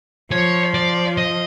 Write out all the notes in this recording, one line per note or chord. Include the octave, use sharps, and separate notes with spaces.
F3 C#5
D5
D#5